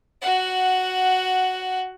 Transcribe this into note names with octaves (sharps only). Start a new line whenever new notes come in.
F#4 F#5